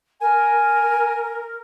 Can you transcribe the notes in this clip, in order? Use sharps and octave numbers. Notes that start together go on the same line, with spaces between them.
A#4 G#5